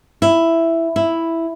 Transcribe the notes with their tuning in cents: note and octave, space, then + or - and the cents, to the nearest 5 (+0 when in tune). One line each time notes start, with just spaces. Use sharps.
E4 +5
E4 +0